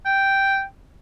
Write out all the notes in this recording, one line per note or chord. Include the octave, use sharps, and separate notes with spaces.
G5